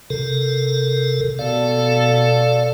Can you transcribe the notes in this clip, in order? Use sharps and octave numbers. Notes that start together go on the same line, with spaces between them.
C3 A4 A#4
B2 A4 D5 F5